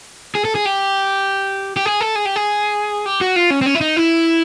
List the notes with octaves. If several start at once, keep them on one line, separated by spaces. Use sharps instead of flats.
G#4
A4
G#4
G4
G4
G#4
A4
G#4
G4
G#4
G4
F#4
F4
C#4
C4
C#4
E4
D#4
E4